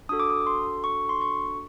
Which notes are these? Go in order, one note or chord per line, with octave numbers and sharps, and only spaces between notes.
D4 F#4 A4 D#6
D6
D#6
C6
C#6
C6
C#6